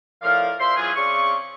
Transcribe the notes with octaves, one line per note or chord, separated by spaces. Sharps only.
A2 F3 A#4 D5 F5
A#2 C5 E5 F5 C6
E2 F#3 C#4 F4 F#4 G#4
C#3 C4 C#4 D5 C#6